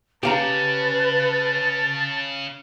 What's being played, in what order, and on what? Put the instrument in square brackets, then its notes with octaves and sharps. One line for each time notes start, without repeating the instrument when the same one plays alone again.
[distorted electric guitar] C#3 [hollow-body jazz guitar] G4 F5 A#5 [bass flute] B4 [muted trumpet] A5